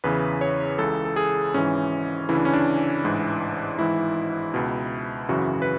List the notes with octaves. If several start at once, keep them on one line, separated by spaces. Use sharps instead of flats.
E2 C#3 E3 B4
C#5
C#2 C#3 E3 A4
A4
G#4
G#1 G#2 E3 C#4
D2 C#3 E3 E4
D4
C#4
D4
A1 G#2 E3
G#1 G#2 E3 E4
C#2 B2
G#1 F#2 C#3 E3 F#4
B4